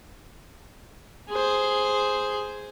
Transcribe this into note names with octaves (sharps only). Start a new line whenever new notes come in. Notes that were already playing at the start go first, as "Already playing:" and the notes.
G#4 C5